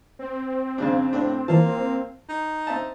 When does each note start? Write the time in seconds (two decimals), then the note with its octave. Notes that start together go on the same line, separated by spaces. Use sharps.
0.19 C4
0.78 F2 C#3 D4
1.13 A2 D4
1.48 E3 F3 A#3 A5
2.29 D#4
2.67 C4 E5 A5